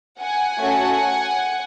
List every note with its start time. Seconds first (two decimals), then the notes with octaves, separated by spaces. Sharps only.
0.21 F#5 G#5
0.60 A3 C#4 F#4 A4